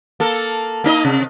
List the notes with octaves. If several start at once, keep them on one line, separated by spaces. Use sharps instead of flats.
A#3 A4
A#3 D#4 D#5
C3